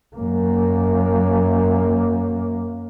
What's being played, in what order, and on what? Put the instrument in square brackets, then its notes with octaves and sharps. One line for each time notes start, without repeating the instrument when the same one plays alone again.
[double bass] F#2 A#3